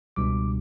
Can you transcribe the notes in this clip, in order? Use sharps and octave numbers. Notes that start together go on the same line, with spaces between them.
C#2 B2 G3 D4 D6